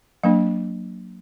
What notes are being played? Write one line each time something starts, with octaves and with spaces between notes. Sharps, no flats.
F#3 A#3 D4 F5